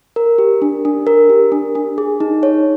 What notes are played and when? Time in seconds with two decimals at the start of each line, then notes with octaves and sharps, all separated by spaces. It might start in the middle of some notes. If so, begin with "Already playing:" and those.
0.16 A#4
0.38 G4
0.62 D4
0.85 D4
1.07 A#4
1.30 G4
1.52 D4
1.75 D4
1.98 G#4
2.20 D#4
2.43 C#5